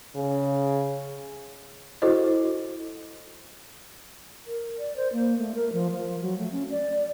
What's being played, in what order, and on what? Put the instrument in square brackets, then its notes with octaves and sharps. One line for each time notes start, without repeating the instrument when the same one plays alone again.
[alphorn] C#3
[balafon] E4 F#4 A4 C5 D#5
[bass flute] A#4
D5
C5
A#3
A3
A#4
F3
F3
F#3
A3
C#4
D5